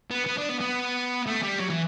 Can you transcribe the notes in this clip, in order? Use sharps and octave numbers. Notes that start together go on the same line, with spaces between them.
B3
B3
D4
B3
B3
A3
G3
F#3
E3